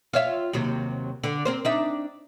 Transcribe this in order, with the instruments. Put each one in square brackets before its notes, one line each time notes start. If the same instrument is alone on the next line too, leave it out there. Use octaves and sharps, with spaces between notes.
[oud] F4 C#5 E5
D#2 C3 F#3
D3
C4 A#4 C5
D4 D#4 E5